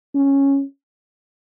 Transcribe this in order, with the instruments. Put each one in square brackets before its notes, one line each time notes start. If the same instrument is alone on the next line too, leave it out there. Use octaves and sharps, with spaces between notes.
[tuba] C#4